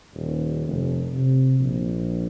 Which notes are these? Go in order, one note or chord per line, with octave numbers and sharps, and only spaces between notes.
D#1
F1
C3
A#1